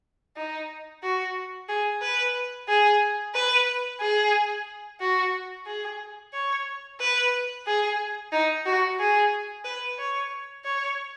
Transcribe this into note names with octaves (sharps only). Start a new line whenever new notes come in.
D#4
F#4
G#4
B4
G#4
B4
G#4
F#4
G#4
C#5
B4
G#4
D#4
F#4
G#4
B4
C#5
C#5